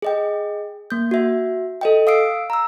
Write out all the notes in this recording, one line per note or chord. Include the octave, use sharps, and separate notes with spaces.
G#4 D#5 G5
A#3 G6
F#4 E5
A4 D#5 G5
F5 D#6 E6 C7 D7
A#5 E6